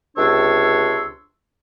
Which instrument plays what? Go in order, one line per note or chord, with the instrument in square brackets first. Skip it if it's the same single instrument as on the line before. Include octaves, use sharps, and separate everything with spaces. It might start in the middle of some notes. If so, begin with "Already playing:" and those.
[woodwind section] C#2 C3 D4 C#5 C6 E6